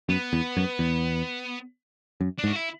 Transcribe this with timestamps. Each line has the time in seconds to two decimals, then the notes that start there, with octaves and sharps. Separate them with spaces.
0.09 F#2 B3
0.33 E2
0.57 F#2
0.79 E2
2.21 F#2
2.38 D4
2.44 G#2
2.47 F#4
2.55 E4